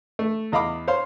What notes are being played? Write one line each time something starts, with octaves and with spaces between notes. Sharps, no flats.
A3
E2 D#5 F5 B5 D6
C5 C#5 F5 C6